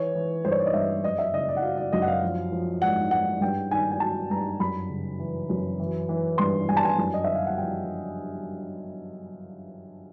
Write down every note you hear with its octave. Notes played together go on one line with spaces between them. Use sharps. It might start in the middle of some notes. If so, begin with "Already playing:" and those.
Already playing: E3 C#5
E3
G2 C5
C#5
D5
D#5
G2 E5
F#2 D#5
E5
C#3 D#5
D5
F#5
F#3 F5
D5
F#2 D#5
F#5
F5
F3
F3
G#2 F#5
G#2 F#5
G2 G5
D#3 G#5
G#5
F#3 A5
G2 A#5
F#2 B5
C#3
E3
F#2
E3
E3
G2 C6
G2 G#5
A5
G#5
F#2
D#5
D3 E5
F5
F#5
F3 G5